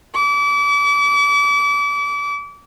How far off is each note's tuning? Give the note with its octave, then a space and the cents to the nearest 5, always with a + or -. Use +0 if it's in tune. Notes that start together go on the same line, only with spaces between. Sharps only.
D6 -35